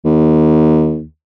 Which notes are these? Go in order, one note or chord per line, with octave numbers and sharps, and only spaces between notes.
D#2